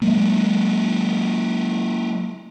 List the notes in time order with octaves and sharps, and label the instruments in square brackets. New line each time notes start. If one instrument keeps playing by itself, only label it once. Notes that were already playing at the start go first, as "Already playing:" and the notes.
[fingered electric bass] F#3 G#3 A#3